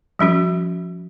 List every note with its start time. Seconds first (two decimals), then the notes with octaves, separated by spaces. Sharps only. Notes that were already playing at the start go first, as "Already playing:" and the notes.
0.19 F3 G3 C#4 F#4